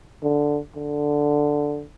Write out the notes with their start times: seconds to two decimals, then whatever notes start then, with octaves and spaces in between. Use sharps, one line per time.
0.23 D3
0.76 D3